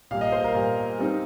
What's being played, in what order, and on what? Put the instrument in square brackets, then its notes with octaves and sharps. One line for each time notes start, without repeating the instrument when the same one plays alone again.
[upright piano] A#2 G3 A#3 [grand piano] F5
[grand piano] D#5
C5
A#4
[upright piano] A#2 G3 A#3
G3 C4 D#4